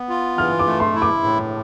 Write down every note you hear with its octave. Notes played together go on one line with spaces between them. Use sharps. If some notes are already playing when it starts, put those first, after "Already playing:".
Already playing: B3
F4
E3 F6
D6
A3
C6
E4
D6
A2